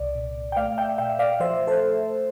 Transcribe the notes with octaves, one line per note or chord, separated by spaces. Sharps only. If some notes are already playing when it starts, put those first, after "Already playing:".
Already playing: C2 C3 D5
A#2
G5
A3 D5 F5
E5 G5
A#2 E5 G5
D5 F5
F3 C5 E5
A4 C5